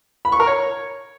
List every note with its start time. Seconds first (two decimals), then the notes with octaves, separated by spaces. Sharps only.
0.25 B5
0.32 C#6
0.40 A#4
0.47 C#5